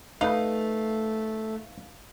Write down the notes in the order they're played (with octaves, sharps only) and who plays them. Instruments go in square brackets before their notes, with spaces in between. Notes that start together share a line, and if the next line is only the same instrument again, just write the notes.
[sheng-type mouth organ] A3 [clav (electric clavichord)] D#4 B4 [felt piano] F5